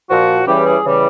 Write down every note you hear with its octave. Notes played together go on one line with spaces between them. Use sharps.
A#2 F3 F#4
C#3 E3 G3 G4
G#4
C#3 E3 G3